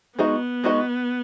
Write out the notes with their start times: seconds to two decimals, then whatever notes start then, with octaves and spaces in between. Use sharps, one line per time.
0.19 G#3 B3 D#4 F#4 D#5
0.64 G#3 D#4 F#4 D#5